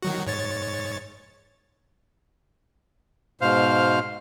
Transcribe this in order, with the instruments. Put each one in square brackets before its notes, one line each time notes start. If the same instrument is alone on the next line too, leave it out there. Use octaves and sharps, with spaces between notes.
[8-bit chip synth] D#3 F#3 F#4
G#2 C#5 A6
[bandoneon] G#2 B2 C5 F5 F6